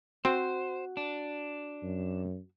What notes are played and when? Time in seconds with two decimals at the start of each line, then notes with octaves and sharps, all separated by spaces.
0.25 C4 F#4 C5
0.97 D4
1.83 F#2